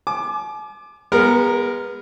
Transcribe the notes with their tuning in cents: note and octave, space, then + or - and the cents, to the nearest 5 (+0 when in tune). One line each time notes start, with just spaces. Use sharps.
G#5 +45 D6 +15
G#3 -30 B3 -20 A#4 +0